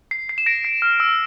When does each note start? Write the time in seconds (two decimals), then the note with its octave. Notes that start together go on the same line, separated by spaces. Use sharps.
0.11 C7
0.29 C7
0.38 E7
0.46 A#6 D7
0.64 C7
0.82 F6
1.00 E6